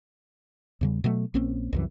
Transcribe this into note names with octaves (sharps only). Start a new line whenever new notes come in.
E2 C#3 G3
B2 F#3 A3
A#1 A#3 C4 C#4
C2 F#2 E3